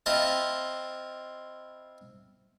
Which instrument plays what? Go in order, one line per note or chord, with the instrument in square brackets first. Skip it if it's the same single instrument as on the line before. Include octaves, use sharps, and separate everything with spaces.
[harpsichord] C4 E4 F4 D#5 A5